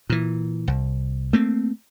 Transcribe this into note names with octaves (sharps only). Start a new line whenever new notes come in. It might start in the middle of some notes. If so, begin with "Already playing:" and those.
A#2 E3
C2
A3 A#3 C4